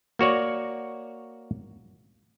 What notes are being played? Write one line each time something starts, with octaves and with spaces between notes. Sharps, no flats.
A#3 F#4 C#5 D5